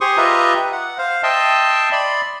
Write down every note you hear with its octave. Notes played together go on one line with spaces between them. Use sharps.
G4 G#4 C5 C6 C#6 D#6
F4 G4 B4 D#5 E5 A#5
F#5
C5 F5
D#5 E5 G5 A5 C6
D5 B5 C6